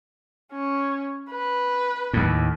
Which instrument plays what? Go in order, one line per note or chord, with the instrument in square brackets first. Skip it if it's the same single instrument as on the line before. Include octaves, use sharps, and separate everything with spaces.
[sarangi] C#4
B4
[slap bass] D#2 A2